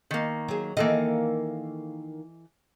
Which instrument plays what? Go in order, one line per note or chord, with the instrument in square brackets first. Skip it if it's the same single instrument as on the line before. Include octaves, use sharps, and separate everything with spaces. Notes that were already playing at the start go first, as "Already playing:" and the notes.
[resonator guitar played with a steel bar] D#3 A#3
[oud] F#3 G#4
[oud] D#3 A#3 [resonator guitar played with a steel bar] E3 A4 D#5